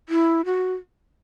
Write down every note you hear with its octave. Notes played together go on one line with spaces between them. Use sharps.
E4
F#4